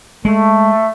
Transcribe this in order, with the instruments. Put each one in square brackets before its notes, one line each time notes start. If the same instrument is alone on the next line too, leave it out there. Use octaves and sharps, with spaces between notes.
[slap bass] G#3 [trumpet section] A3